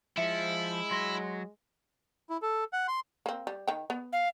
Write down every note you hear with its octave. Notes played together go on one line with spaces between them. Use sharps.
F3 G#3 E4 E5 C#7
F#3 C6 A#6 G7
E4
A4
F#5
C6
A#3 C4
G3
D#3 G5
B3
F5